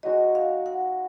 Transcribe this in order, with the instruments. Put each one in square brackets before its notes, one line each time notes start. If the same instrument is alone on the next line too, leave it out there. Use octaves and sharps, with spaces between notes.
[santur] G#3 D#4 F#4 C#5 [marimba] D#5
[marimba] F5
F#5